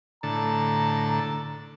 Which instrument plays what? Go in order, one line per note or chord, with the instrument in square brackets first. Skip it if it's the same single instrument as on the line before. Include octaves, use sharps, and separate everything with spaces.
[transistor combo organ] A2 D3 A5 [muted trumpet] A#5